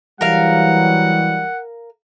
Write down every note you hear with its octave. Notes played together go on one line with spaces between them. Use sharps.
E3 F#3 G3 A#4 F5 F#5